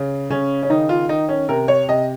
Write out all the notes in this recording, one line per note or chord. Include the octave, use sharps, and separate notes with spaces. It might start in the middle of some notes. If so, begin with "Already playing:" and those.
Already playing: C#3
C#3 C#4
C#4
D#3 D#4
F4
D#3 D#4
C#4
C3 A#4
C#5
C3 D#5